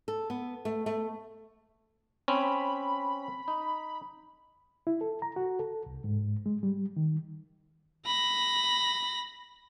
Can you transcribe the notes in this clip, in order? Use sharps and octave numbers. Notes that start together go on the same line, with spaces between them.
A4
B3
A3
A3
C4 C#4 B5
D#4
E4
A4
A#5
F#4
A4
C2
G#2
G#3
G3
D#3
B5 A#6